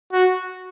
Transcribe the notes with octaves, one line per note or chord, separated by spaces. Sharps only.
F#4